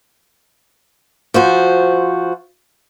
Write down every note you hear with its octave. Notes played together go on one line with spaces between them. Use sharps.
F3 F#4 C5